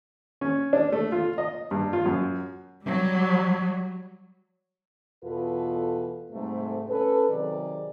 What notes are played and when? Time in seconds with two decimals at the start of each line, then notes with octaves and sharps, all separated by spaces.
0.41 C#4
0.73 D4
0.92 A3
1.12 F4
1.38 D#5
1.71 G2
1.93 F4
2.06 F#2
2.84 F#3 G3
5.24 E2 B2 F4 A4 B4
6.32 G#2 C3 G3 A3
6.89 C#4 A4 B4
7.29 C3 D#3 F#3 G#4 D5